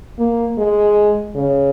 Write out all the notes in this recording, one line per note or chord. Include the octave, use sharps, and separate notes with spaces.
A#3
G#3
C#3